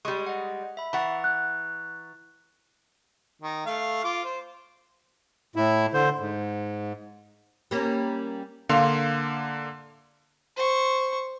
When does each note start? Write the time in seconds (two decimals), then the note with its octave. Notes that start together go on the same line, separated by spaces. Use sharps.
0.05 G3 G#3 C#6
0.26 D#5 F#5
0.77 E5 B5
0.93 E3 F#5 A#5 C#6 A6
1.24 F#6
3.42 D#3
3.66 A3 F5
4.04 F4 D6
4.24 C5
5.56 A2 E4
5.93 D3 C5
6.20 G#2
7.71 G3 A#3 C#4
8.69 D3 A#3 F5 C6
10.57 C5 C#6